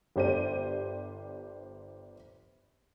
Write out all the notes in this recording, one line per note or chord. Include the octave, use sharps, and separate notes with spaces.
G1 G4 C5 D5 D#7